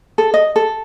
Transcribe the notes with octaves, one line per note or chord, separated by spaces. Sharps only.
A4
D#5
A4